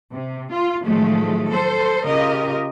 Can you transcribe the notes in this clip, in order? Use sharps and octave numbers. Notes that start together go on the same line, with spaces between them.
C3
F4
A2 D#3 F3 F#3 G#3 A3
A4 C5
C#3 F4 G4 A#4 D#5